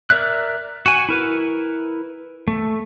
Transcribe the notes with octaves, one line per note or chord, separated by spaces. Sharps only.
A#4 D5 E5 F#6
F#4 G#5
E4 A#4 B4
A3